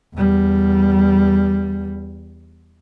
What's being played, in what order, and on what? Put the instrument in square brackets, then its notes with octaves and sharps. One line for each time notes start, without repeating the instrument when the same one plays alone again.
[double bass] E2 G3